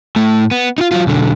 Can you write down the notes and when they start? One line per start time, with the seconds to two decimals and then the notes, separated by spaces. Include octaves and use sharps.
0.16 A2 A3
0.51 B3
0.78 D#4 F4
0.91 F#3 F4
1.07 B1 D3